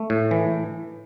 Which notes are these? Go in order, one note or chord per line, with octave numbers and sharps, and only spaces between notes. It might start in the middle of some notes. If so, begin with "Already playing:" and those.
Already playing: A3
A2
E3